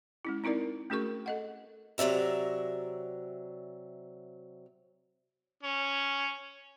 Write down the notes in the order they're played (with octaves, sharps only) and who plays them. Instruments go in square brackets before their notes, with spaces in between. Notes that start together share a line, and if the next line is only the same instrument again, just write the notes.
[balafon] G#3 C#4 E4
C4 D#4 E4 A#4 D5
A3 C#4 F#4 G#4 A#4 C#6
A4 D#5 F#5
[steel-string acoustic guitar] C3 F#3 D5 E5 A#5
[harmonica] C#4